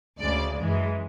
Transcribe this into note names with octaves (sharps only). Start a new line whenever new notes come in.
D2 C#3 G#3 D5
F#2 E3 G#3